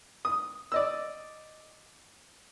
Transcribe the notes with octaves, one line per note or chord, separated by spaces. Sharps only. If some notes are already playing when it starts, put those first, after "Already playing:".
D#6
D5 D#5 E6